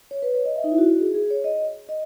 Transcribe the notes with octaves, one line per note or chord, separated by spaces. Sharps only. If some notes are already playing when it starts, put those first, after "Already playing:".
C#5
B4
C#5
D#5
E5
D#4
E4
F#4
F#4
G#4
G#4
C#5
D#5
D#5